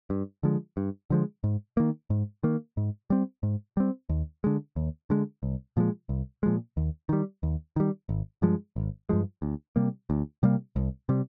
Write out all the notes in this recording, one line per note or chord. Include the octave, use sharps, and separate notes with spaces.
G2
D3 F3 G#3
G2
D3 F3 G#3
G#2
D#3 A#3
G#2
D#3 A#3
G#2
G3 C4
G#2
G3 C4
D#2
D3 G#3
D#2
D3 G#3
C2
A#2 F3 G#3
C2
A#2 F3 G#3
D#2
D#3 G3
D#2
D#3 G3
G#1
G2 F3 G#3
G#1
G2 F3 G#3
D2
C3 G3 A#3
D2
C3 G3 A#3
C2
C3 G3